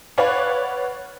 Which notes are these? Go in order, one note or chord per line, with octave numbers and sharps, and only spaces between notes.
B4 C#5 D5 F5 F#5